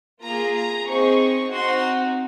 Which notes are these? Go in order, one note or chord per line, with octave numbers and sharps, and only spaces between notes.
A#3 F4 G#4 A#5
A#5
C4 D#4 G#4 C#6
C4 D#4 F#4 C6